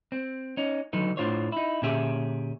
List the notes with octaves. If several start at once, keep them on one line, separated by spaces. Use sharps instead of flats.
C4
C#4 D#4
D3 D#3 F#3 D#4 B4
A2 D4 F4 C5 C#5
D#4 E4
A#2 D3 C#4 G4 G#4 E5